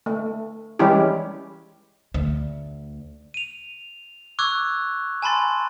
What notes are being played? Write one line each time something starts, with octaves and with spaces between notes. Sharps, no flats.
A3
E3 G3 G#3 C#4 E4 G4
D2
D#7 F7
C#6 D6 E6 F#6 G#6
G#5 A5 B5 C6 A6